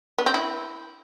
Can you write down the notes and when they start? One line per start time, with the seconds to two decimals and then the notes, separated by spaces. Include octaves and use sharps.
0.18 B3
0.26 C4
0.34 E4